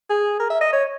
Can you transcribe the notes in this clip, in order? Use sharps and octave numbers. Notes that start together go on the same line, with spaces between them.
G#4
A#4
E5
D#5
C#5